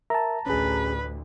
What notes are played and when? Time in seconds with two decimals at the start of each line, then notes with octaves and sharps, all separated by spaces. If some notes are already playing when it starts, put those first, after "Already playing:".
0.10 A#4 E5 A5 A#5
0.46 A1 D2 C#4 G#4 B4